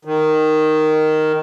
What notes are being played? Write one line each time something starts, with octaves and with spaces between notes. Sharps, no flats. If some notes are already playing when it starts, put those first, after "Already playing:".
D#3